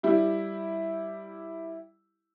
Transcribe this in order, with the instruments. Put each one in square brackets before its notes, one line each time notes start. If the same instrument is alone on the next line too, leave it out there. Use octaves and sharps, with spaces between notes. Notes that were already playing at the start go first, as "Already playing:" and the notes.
[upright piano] G3 E4 G4